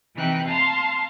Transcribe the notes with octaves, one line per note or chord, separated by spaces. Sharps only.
C3 E3 D#4 G5 F#6
F5 A5 A#5 C6